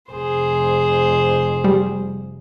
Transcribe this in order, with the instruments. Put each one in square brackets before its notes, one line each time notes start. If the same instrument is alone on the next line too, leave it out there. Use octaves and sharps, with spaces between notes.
[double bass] F1 [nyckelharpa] G#4 C5
[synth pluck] G3